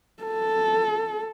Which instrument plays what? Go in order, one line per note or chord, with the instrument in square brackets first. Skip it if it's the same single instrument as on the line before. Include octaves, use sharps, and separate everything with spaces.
[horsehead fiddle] A4